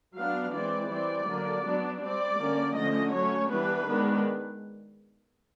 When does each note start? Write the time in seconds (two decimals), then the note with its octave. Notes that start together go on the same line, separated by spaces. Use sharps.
0.15 F#3 B3 D4 F5
0.52 E3 G#3 C4 D5
0.89 E3 G3 C4 D5
1.27 D3 F#3 A#3
1.64 F#3 B3 D4
2.00 G3 C4 D5
2.38 D3 G3 A#3 C#4
2.75 D3 F3 A3 C#4 D#5
3.12 F#3 A3 C#4 C#5
3.49 E3 G3 B3 D4 B4
3.86 D#3 G#3 B3 D4